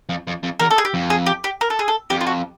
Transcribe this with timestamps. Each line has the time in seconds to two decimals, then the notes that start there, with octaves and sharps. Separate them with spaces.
0.09 F2
0.27 F2
0.43 F2
0.60 E2 A#4
0.71 A4
0.78 G#4
0.85 G4
0.94 F2
1.10 G#4
1.26 G4
1.44 G4
1.61 A#4
1.70 A4
1.79 G#4
1.88 A4
2.10 F2 G4
2.21 F4
2.27 F#4